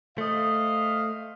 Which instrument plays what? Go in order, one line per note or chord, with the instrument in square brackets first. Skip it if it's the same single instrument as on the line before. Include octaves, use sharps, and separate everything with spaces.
[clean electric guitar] A3 [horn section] C5 D#5 F5